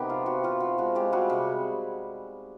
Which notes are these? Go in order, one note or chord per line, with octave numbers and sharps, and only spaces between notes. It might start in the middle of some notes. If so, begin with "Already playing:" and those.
Already playing: C3 D#3 B3 G4
F3 F4
F3 F#4
F3 F4
F3 F#4
G#3 F#4
G#3 F4 G4
G3 F#4 G#4
C3